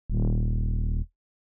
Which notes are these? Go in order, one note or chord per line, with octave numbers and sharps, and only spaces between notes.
D#1